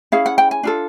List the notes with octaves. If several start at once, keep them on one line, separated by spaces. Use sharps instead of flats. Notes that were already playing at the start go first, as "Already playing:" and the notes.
C#4 E4 G#4 F5
F#5
G5
G#5
D4 F4 A4